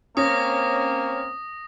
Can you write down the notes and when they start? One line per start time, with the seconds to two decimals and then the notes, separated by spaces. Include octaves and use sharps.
0.17 A#3 C4 C#4 D#6 A#6